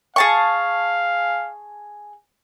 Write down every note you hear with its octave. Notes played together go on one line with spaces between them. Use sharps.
G#4 F5 A5 C#6